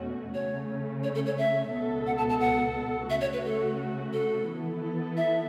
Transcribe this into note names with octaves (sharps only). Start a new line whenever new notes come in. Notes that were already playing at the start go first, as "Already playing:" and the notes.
Already playing: E2 B2 A3 C#4 F#4
C#3 A3 C#4 C#5
C#5
A4
C#5
E5
C#2 B2 B3 A4
F#5
A5
A5
F#5
C#3 A3 F#4 E5
C#5
B4
A4
A4
E3 B3 E4 A4
E5